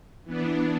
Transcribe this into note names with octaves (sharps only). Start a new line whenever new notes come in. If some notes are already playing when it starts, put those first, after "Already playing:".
E3 B3 D4